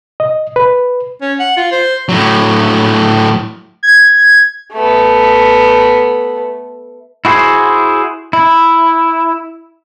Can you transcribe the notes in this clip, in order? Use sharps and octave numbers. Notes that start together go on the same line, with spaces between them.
D#5
B4
C#4
F#5
F4
C5
A2 F#3
G#6
A3 B3
E4 F#4 G#4 C5
E4